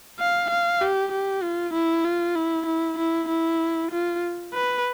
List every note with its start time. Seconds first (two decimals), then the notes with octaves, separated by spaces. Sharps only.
0.19 F5
0.50 F5
0.81 G4
1.12 G4
1.43 F4
1.74 E4
2.05 F4
2.36 E4
2.66 E4
2.98 E4
3.29 E4
3.91 F4
4.54 B4